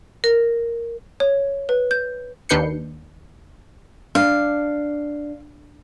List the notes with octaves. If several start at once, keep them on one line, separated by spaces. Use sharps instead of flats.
A#4
C#5
B4
G6
D#2 D4 B4 G6 C7 C#7
D4 F5